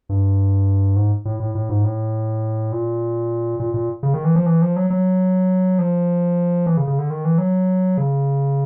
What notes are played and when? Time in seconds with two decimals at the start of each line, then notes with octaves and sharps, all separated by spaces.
0.09 G2
0.96 G#2
1.25 A2
1.40 A2
1.55 A2
1.69 G#2
1.85 A2
2.72 A#2
3.60 A#2
3.74 A#2
4.03 C#3
4.14 D#3
4.24 E3
4.36 F3
4.46 E3
4.62 F3
4.76 F#3
4.90 F#3
5.79 F3
6.66 E3
6.77 C#3
6.87 C#3
6.99 D3
7.10 D#3
7.25 E3
7.38 F#3
7.98 C#3